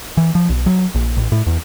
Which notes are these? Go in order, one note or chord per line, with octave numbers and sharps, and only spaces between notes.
E3
F3
B1
F#3
A#1
A1
A2
E2